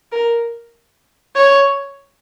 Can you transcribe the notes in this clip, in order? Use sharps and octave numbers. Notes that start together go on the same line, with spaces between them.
A#4
C#5